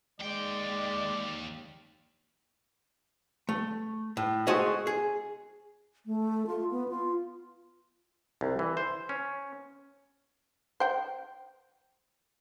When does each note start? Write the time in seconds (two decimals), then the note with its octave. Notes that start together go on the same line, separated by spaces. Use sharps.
0.20 D#2 G#3 D5 G5
3.49 A3
4.17 A2
4.47 G#3 A3 F#4 G#4 C5 D#5
4.87 G#4
6.06 A3
6.47 F4
6.71 B3
6.89 F4
8.41 C2
8.59 E3
8.77 C5
9.09 C#4
10.80 C5 G5